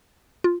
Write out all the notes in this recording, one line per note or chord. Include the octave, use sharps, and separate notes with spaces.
F4